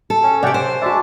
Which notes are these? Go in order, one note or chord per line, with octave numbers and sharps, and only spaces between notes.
A4
C#4
C3 G4 D5 F#5 G5
C5
G#3 D4 F#4 E5 A5